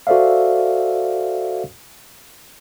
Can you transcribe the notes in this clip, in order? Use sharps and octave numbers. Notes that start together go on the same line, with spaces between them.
F#4 A4 C5 D5 E5 F5